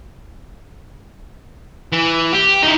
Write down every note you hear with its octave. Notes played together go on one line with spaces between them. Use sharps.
E3
G4
D#4 E4